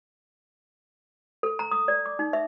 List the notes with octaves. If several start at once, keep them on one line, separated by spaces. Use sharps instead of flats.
A4
A#5
D#6
D5
D6
D#4
E5